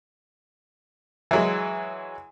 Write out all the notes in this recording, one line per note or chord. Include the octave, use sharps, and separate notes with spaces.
E3 F#3 G#3